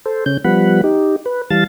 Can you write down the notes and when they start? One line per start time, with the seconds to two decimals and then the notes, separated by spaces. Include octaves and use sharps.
0.06 A4 C5
0.26 C#3 C#4 G6
0.44 F3 G3 B3 F#5 B5
0.84 D#4 G4
1.26 B4
1.50 E3 G3 F5 A5 A6